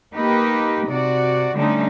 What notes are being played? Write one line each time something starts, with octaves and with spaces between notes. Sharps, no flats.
A#3 D#4 G4 B4
C3 F#4 D5
D3 G3 A3 C#4 D#4